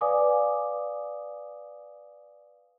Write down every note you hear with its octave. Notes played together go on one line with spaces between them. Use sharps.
B4 D5 F5 G#5 D6 D#6